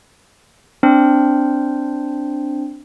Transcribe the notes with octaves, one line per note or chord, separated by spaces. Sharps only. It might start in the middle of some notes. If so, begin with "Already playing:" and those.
C4 D4 C5